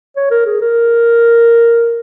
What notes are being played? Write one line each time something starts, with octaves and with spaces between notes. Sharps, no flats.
C#5
A#4
G#4
A#4